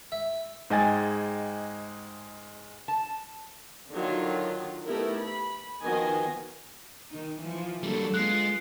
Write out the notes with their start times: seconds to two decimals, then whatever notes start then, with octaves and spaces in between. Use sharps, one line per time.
0.12 E5
0.70 G#2 G#3 D#5 G5 G#5 A6
2.88 A5
3.91 D3 D#3 F#3 F4
4.87 A3 B3 D#4 E4 G4 A#4
5.19 B5
5.82 D#3 F3 B3 F#4 D#5 G#5
7.09 D#3 D#4
7.39 E3 F3
7.83 D3 F#3 G3 A#3 A4
8.14 G#3 B3 F4 F#6 C7